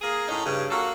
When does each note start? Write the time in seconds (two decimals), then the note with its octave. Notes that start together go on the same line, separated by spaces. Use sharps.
0.01 A#3 G#4
0.27 A2 C#4 D#4
0.45 G2 C#3
0.69 A#3 F#4 A4